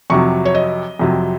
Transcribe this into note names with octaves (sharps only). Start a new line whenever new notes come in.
F2 C3 F#3 C#6
C#5
D#5
F2 C3 F#3